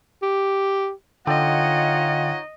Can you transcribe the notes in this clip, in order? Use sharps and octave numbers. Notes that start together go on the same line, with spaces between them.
G4
D3 D#4 F4 C#5 D#5 F#5 G5